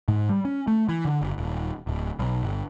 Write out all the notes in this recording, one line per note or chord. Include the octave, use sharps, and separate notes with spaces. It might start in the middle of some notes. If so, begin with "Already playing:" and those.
G#2
G3
C#4
A3
E3
D3
F#1
D#1
D1
B1
G1